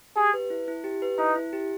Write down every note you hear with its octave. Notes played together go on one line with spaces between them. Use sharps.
G4 G#4
B4
E4
E4
G4
B4
D#4 E4
E4
G4